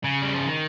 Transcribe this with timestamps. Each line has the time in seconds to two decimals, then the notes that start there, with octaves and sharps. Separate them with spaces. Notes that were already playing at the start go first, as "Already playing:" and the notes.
0.05 C#3
0.23 G3
0.34 F3
0.46 D#3